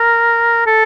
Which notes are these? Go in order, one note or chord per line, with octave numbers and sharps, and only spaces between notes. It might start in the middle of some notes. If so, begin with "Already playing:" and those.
Already playing: A#4
A4